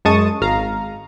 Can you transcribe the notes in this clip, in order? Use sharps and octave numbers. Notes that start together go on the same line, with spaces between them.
F#2 G#3 A5 C#6 D#6 D#7
G#1 F5 A#5